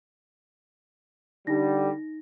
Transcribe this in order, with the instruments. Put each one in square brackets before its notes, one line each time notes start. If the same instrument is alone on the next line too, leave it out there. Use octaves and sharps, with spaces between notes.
[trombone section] D3 G3 [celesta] D#4 A#6